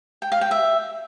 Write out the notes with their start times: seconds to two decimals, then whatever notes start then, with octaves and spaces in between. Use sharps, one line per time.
0.22 G5
0.32 F5
0.41 G5
0.51 E5